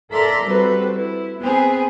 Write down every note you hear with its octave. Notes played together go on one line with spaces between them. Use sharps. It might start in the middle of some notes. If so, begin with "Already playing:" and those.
A4 A#4 D5 E5 A#5 C6
G3 C4 F#4 A4 B4
E4
B3 C4 G#4 B4